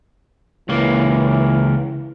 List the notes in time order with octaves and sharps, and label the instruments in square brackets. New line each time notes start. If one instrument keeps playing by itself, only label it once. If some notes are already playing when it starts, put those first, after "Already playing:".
[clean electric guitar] C#2 A#3 [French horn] E3